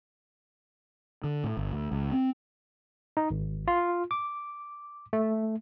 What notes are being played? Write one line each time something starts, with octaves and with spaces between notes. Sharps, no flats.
D3
A2
G1
D2
C#2
C4
D#4
G#1
F4
D6
A3